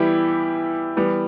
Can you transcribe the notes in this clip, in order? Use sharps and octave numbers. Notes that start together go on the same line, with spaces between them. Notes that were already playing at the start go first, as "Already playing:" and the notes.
Already playing: E3 G3 B3 E4 G4
E3 G3 B3